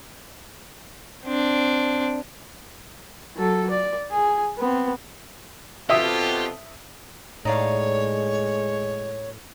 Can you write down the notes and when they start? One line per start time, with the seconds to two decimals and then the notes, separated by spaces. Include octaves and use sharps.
1.25 C4 D4
3.36 F#3 A4
3.70 D5
4.11 G#4
4.58 B3 C4
5.90 B2 C4 F4 G4 A4 E5 D#6
7.45 A2 G#3 D#4 C#5 D5 F5